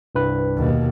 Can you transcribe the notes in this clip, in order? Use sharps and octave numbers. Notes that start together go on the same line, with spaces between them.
C2 G2 B4
D#2 B2